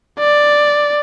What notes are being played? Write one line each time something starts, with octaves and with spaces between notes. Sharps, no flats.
D5